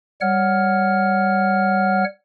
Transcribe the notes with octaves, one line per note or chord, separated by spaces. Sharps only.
G3 C#5 F#5 F6